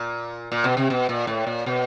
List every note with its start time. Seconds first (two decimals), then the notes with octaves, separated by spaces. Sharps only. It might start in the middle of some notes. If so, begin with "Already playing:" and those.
Already playing: A#2
0.52 A#2
0.64 B2
0.77 C3
0.90 B2
1.09 A#2
1.27 A2
1.47 A#2
1.66 B2